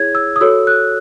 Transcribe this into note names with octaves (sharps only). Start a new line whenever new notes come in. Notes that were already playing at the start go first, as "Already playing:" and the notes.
Already playing: E4 G#4 C#5 G#6
E6
D#6
F#4 A4 C#5 E6
F#6